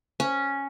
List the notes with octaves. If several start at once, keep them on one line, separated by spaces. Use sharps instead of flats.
C#4